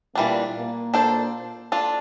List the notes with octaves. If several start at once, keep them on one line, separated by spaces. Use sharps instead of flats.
A#2 E3 G3 A#3 D4
A#2 A#3
D4 A4 C5
D4 F4 A4